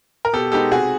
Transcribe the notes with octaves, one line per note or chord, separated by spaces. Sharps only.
A#4
B2 G4 A4
G#3 B3 D#4 G4 A4
C3 F#4 G#4